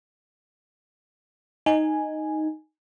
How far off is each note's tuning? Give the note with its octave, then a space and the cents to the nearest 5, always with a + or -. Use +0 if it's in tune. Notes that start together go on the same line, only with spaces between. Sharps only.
D#4 +0 G#5 +0